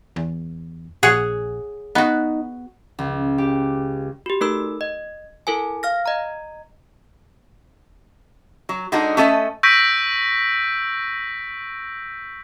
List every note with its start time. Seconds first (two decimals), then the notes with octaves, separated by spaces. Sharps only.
0.16 E2
1.03 A#1 G#4 C#5 F#5
1.95 B3 D#4 F#4
2.99 C#2
3.38 G4
4.26 F#4 G4
4.41 A3 D#4 A4 A#4 B5 E6
4.81 D#5
5.47 E4 A4 A#4 G#5
5.83 F5 F6 A#6
6.06 D#5 A#5
8.69 F#3
8.92 D3 G#3 D4 D#4 F#4
9.17 A3 C#4 A4 D#5 E5
9.63 C#6 E6 G6 A#6 B6 D7